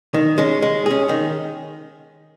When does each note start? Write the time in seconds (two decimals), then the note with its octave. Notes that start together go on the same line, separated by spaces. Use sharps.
0.14 D#3
0.38 G#3 C#4
0.62 G#3
0.86 C#4 G#4
1.09 D#3